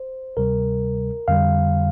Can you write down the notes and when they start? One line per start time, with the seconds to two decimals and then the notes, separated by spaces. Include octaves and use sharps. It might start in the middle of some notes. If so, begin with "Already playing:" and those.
Already playing: C5
0.37 D2 C3 G3 A#4
1.28 F2 D3 G3 F5